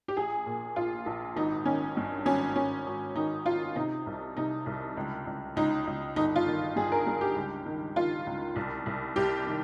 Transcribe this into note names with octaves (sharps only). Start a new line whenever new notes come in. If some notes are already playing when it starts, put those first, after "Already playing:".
G4
A#1 G#4
A#2
A#1 F4
A#1
G#1 D#4
D#3 C#4
G2
G#1 C#4
G#1 C#4
G#1
D#3 D#4
G#1 F4
C3 D#4
C2
C3 D#4
C2
C#2
C#2
C#2 D#4
C#2
G1 D#4
F4
D#3
G2 G#4
A#4
G2 G#4
G4
C#2
D#3
D#3 F4
C#2
C2
C2
C2 G4
D#3